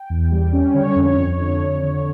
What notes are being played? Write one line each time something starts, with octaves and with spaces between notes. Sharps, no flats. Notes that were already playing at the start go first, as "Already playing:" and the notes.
Already playing: G5
E2
G3
C#4
D3 C#5
F2
C#5
F2
C#5
D3
F2
D3